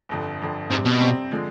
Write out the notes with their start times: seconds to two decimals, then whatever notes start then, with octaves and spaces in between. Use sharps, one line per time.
0.09 G1 F2 D3
0.39 G1 F2 D3
0.70 G#2 C3 G3 C4
0.85 B2
1.00 C3 G3 C4
1.31 D3 F3 G#3